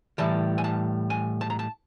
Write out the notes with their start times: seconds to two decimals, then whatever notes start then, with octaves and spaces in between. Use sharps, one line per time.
0.18 A2 E3 G3 A5
0.58 G#5
0.64 A5
1.10 G#5
1.41 A5
1.50 A#5
1.59 A5